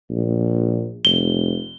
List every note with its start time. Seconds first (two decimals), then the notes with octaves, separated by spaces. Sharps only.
0.10 A#1
1.05 F1 G7